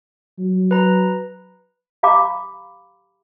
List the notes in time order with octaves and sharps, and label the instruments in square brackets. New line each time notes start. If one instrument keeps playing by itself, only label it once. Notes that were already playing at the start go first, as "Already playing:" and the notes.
[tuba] F#3
[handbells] B4 A#5
[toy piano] G4 F5 A#5 B5 D6